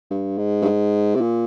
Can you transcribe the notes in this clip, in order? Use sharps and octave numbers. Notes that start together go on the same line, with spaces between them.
G2
G#2
G2
G#2
C3
A#2